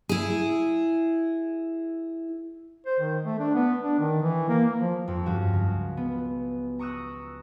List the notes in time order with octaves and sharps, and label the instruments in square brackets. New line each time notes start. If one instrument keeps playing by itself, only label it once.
[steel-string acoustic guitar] E4 G#4
[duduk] C5
D#3
A3
D4
B3
D4
D#3
E3
A#3
A#3
F3
[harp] F2
G2 F3 C#4 F#4 F5
C#2
B3
A#5 C#6 D#6 E6 F#6